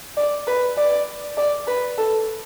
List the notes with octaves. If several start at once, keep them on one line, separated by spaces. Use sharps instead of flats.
D5
B4
D5
D5
B4
A4